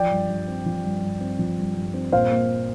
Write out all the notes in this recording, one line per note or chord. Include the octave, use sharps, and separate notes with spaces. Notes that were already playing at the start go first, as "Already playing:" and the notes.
Already playing: F3 D5 G5
G2
G2
C4
F3
G2
G2
C4
F3
G2
G2
C4
A#2 C5 F5
A#3